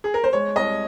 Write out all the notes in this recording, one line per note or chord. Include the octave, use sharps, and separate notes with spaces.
G#4
A#4
C5
G#3 C#5
C2 D#5